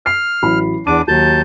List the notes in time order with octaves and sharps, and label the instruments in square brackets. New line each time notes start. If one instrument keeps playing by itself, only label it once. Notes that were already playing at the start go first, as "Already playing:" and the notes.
[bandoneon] F6 [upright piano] C7
[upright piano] A1 F#3 B5
[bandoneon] E2 D4 D6 [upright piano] D#7
[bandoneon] D#2 A5 G6 [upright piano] F#3